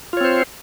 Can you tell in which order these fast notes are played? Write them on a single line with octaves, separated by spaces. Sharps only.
F4 C#5 C4 C5